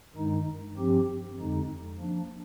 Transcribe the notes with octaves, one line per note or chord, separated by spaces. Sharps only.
G2 D#3 G#3 D#4
G2 F3 C4 G4
F2 D3 G#3 D#4
F3 A#3 D4